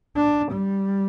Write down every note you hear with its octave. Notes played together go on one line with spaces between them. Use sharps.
D4
G3